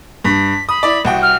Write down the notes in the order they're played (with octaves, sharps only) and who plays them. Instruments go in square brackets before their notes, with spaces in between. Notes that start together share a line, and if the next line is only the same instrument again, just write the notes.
[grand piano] G2 [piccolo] B6
[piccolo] B5 [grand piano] D#6
[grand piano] E4 D5
C2 F#4 G5
[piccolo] F6